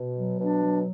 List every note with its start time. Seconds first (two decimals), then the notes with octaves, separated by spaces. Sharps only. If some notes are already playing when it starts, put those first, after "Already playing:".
Already playing: B2
0.16 F#3
0.39 B2 D4
0.64 F#3